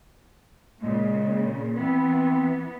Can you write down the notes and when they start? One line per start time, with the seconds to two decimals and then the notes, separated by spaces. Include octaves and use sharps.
0.81 A#2 C#3 G#3
1.74 E3 B3 C4